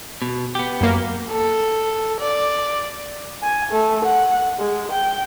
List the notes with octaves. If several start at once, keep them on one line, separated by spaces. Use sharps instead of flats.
B2
B3 G4
F#2 A#3
A4
D5
G#5
A3
F#5
G#3
G5